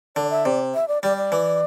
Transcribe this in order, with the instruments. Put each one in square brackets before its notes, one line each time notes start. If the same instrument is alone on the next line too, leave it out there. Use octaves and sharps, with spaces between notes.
[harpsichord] D3 [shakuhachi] D5
[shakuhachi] E5
[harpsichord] C3 [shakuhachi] D5
[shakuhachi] E5
D5
[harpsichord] G3 [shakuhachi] D5
[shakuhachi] D5
[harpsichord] E3